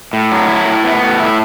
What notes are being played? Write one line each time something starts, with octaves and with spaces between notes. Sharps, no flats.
A2
F#3
E4
A2
B3
A2
E4